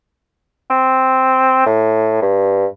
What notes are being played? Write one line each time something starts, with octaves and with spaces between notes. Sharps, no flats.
C4
A2
G2